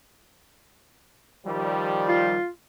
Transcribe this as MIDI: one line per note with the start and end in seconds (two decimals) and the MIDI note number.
1.46 2.38 51
1.46 2.38 53
1.46 2.38 55
2.08 2.49 65